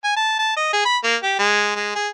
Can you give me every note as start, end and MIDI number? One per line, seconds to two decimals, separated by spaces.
0.04 0.13 80
0.16 0.36 81
0.39 0.53 81
0.57 0.69 75
0.73 0.81 68
0.85 0.97 83
1.04 1.16 58
1.23 1.35 67
1.39 1.75 56
1.76 1.91 56
1.95 2.08 68